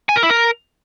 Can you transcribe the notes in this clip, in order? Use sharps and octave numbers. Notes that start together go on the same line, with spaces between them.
G#5
A#4
E4
A#4